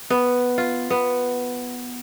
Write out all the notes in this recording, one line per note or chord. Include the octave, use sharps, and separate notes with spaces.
B3
F4
B3